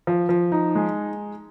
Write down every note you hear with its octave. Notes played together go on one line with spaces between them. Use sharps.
F3
F3
D#4
G#3